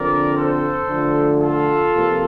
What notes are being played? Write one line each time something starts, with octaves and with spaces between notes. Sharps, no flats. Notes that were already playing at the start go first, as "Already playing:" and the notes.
Already playing: D3 F3 C4 A#4 D5
A4 C5
D3 F3 A3
F4 A4
C3 F3 A#3